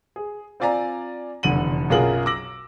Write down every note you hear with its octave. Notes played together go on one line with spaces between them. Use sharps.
G#4
C4 F4 D5 G#5 A#5
F1 E2 D3 D#7 F#7
B1 F#2 F4 G#4 A#4 F#7
D6 E6 A#6 F#7